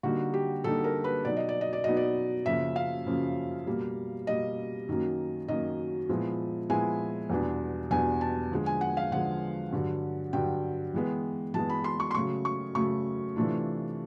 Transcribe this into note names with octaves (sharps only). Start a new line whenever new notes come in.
D3 G3 A#3 D#4 F#4
G4
D3 G3 A#3 D#4 A4
A#4
B4
B2 F#3 B3 D#4 D5
D#5
D5
D#5
D5
B2 F#3 B3 D#4 D#5
D5
F#2 C#3 F3 A#3 E5
F5
F#2 C#3 F3 A#3
B2 G3 A#3
B2 G3 A#3 D#5
F#2 D#3 F#3 A#3
F#2 D#3 F#3 A#3 D#5
A#2 F3 G#3 B3 E4
A#2 F3 G#3 B3 E4 G#5
E2 B2 G3 B3 D4
E2 B2 G3 B3 D4 G#5
A5
D3 F3 G#3
G#5
F#5
F5
D3 F3 G#3 F#5
G2 D3 F#3
G2 D3 F#3 G5
E3 G#3 B3
E3 G#3 B3 A5
B5
C6
C#6
C6
C#3 F#3 A3 C#6
C#6
C#3 F#3 A3 C#6
C3 E3 A3 D4 F4